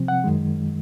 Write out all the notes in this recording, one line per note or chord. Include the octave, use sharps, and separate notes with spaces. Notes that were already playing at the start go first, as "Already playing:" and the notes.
Already playing: C3 F3 C4
F#5
F#2 D#3 G#3